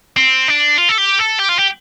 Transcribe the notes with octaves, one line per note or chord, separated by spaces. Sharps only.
C4
D4
F4
A4
G4
A4
G4
F4
G4